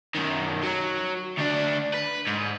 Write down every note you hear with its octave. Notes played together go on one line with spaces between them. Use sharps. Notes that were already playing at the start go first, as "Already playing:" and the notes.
F#2 D#3
F#3
D2 D4
B4
G#2